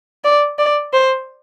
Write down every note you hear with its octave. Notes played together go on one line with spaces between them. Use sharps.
D5
D5
C5